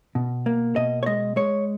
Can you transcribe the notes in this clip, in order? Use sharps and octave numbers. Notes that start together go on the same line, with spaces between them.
B2
A#3
B2 D#5
C#5
G#3 D#5
G#3 C#5